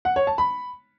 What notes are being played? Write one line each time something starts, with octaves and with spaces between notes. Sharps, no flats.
F#5
C#5
A5
B5